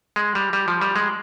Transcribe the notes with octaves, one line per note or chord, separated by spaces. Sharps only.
G#3
G3
G3
F3
G3
G#3